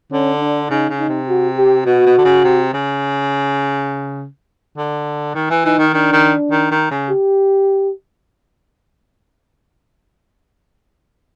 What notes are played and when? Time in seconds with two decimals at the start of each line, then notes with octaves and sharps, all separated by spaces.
0.11 D3 C#4
0.41 D4
0.70 C#3 D#4
0.90 C#3
0.99 D#4
1.09 C3
1.28 F#4
1.57 G4
1.86 B2 F#4
2.06 B2
2.18 D3
2.25 C#3
2.44 C3
2.74 C#3
4.77 D3
5.35 D#3
5.50 E3
5.65 E3 D#4
5.79 D#3
5.94 D#3 D4
6.13 D#3
6.52 D#3
6.71 D#3
6.91 C#3
7.10 G4